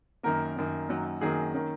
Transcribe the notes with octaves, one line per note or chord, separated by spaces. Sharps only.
F#2 D#3 A#3 A#4
F#2 D#3 A#3
F#2 D#3 F#3 A#3
F#2 D#3 F#3 A#3 G#4
D#3 A#3 C#4